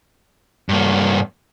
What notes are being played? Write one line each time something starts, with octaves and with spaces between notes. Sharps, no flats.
G2 A#3